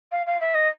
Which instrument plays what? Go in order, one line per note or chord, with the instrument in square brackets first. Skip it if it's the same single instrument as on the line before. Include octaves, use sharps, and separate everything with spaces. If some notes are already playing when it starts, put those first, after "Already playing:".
[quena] F5
F5
E5
D#5